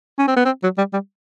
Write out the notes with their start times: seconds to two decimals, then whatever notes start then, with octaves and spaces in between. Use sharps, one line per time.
0.19 C#4
0.28 C4
0.36 B3
0.45 C4
0.64 F#3
0.78 G3
0.93 G3